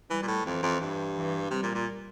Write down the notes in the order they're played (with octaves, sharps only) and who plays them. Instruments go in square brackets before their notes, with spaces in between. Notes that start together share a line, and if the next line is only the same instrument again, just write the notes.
[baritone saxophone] E3 [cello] G3
[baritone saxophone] A#2
A2
[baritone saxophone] F2 [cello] E3
[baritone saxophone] F2
G2
[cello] E3
[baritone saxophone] C3 [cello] G3
[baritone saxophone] A#2
A#2